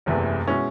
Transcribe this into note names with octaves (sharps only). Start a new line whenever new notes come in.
F#1 E2 C3 E3 A3
B2 G#3 C#4 E4